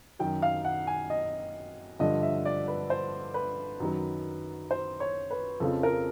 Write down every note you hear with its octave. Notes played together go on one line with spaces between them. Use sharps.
F#2 D#3 F#3 G5
F5
F#5
G#5
D#5
G2 D3 F3 D#5
E5
D5
B4
C5
B4
F#2 D#3 F#3
C5
C#5
B4
F2 C#3 F3 A4
A#4